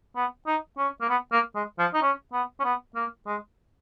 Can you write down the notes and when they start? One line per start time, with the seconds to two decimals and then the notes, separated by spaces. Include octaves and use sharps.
0.16 B3
0.47 D#4
0.78 C#4
1.01 A#3
1.09 B3
1.32 A#3
1.55 G#3
1.79 F3
1.94 D#4
2.02 C#4
2.33 B3
2.60 C#4
2.64 B3
2.95 A#3
3.27 G#3